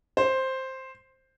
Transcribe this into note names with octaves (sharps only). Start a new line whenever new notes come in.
C5